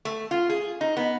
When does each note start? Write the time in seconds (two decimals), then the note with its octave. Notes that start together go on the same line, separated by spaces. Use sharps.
0.05 A3
0.31 F4
0.49 G#4
0.81 D#4
0.97 B3